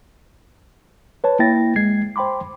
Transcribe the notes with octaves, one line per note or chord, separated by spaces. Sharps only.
B4 C#5 A5
A#3 E4 G5 A6 A#6
G#3 G#6 C7
C5 G5 B5 C6 D6